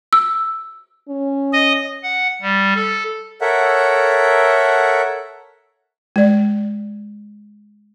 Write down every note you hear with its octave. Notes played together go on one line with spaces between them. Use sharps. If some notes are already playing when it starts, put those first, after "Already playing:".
E6
C#4
D#5
F#5
G3
A4
A4 A#4 C#5 E5 F#5
G#3 D5